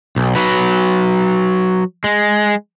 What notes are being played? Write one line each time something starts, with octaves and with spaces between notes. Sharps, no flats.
B1
F#3 B4
G#3